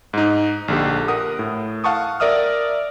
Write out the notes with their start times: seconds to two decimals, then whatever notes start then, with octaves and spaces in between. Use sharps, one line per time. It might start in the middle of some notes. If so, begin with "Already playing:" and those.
0.13 G#2 D#4
0.68 A#1 D3 G4
1.08 A#4 F#5 D#6
1.39 A2
1.84 F5 F#5 A5 C#6 D#6
2.20 A#4 D5 E5 D#6 F6